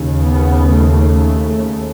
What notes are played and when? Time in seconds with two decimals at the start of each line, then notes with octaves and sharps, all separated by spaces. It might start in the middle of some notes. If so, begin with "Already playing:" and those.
Already playing: D#2 C#3
0.20 B3
0.71 A3
1.23 A3